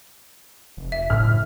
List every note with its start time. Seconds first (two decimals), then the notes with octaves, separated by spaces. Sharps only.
0.77 F1
0.92 E5
1.10 F#1 F#2 A2 D3 F6